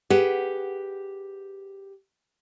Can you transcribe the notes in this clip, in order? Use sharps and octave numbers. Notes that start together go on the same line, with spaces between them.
G4 G#4 B4 F#5